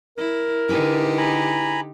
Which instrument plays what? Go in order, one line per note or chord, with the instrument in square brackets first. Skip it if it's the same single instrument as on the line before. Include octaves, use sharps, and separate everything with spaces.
[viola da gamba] E4 [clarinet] A#4
[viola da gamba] D3 D#4 G4 [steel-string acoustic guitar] E4 G#4 B4
[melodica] G#5 A#5 B5